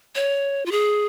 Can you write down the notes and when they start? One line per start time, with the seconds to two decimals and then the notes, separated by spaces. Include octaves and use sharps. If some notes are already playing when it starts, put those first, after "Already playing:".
0.15 C#5
0.66 F4
0.72 G#4